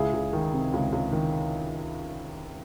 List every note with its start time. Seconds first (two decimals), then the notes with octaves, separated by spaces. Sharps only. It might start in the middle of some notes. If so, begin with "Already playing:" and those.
Already playing: C#2 E4 G#4
0.13 C#2
0.33 D#3
0.54 C3
0.73 C#2
0.92 C#2
1.12 D#3